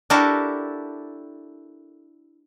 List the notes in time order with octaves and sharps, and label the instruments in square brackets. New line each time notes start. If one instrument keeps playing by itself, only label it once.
[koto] D4 E4 F#4 G4 A4 A#4